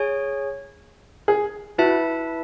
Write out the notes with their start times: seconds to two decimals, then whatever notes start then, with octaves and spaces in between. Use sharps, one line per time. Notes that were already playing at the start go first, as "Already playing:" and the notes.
Already playing: G#4 C#5 G#5
1.28 G#4
1.78 E4 F#4 B4 E5 A5